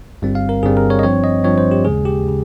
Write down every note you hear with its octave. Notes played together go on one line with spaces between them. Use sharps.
G1 G2 G3 C4
F5
A#4
G1 G2 G3 C4 G#4
A#4
C#5
D#5
G2 F3 C4 C#5
D#5
G2 F3 C4 C#5
C5
G4
D#2 C#3 G#3 G#4
G4
C#3